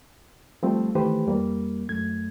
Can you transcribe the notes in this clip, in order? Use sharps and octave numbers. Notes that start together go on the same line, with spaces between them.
F3 G3 A3 C4
D#3 E3 A3 G4 B4 C5
F2 G3 A#3
F#2 A3 G#6